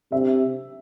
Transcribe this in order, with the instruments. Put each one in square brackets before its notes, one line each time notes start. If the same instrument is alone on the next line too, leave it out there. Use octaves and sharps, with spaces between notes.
[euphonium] C3 [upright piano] E5